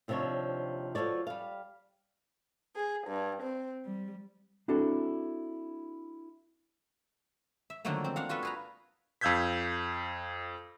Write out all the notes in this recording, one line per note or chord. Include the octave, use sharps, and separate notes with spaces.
D#2 C3 F3 G3 D4 C#5
F3 F#4 A4 C#5 D5
G3 F5
G#4
G2
C4
G3
C4 D4 E4 F#4 A4
E5
D3 D#3 F3 F#3 A3 A#3
C4
D4 F5 F#5
F4 F#4 A4 B4
G#4 B4 A#5
F2 F5 E6 G6 G#6 B6